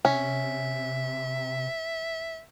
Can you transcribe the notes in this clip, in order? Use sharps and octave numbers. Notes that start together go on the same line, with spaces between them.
C3 C#4 E5